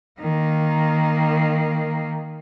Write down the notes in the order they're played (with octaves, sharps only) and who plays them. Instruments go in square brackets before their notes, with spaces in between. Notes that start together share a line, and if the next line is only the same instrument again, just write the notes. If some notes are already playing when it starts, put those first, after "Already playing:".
[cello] D#3 A#3